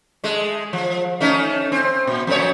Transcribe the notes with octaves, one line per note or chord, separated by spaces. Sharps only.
G#3 A3
F3
A3 C#4 D#4
C4
A#2
F2 A3 C#5